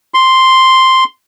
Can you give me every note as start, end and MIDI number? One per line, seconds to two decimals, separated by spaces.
0.14 1.04 84